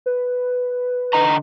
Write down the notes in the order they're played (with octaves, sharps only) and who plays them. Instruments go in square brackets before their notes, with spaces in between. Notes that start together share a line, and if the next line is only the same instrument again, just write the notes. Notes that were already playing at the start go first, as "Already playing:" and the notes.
[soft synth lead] B4
[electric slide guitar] D3 D#5 A#5